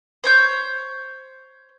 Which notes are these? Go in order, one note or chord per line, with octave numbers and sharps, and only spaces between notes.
C5 C#5 G6